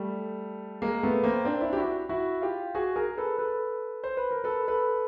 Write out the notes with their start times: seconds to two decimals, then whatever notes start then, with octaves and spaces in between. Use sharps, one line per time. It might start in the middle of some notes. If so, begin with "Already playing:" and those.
Already playing: G3 A3
0.82 G#3 A#3
1.03 A3 B3
1.24 A#3 C4
1.45 C4 D4
1.61 D4 E4
1.73 G4
1.77 E4 F#4
2.09 E4 F#4
2.42 F4 G4
2.75 F#4 G#4
2.96 G#4 A#4
3.17 A4 B4
3.38 A4 B4
4.04 C5
4.17 B4
4.31 A#4
4.44 A4 B4
4.68 A4 B4